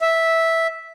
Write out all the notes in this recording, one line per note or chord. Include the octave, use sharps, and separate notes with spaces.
E5